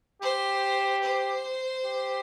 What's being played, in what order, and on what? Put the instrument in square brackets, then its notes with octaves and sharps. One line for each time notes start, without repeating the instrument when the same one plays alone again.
[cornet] G4 [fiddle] C5
[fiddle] C5
[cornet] G4